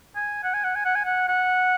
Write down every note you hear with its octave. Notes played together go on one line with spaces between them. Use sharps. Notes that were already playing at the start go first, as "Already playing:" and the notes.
G#5
F#5
G#5
F#5
G#5
F#5
G#5
F#5
F#5